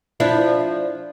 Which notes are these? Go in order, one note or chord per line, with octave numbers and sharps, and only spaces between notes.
F3 D4 E4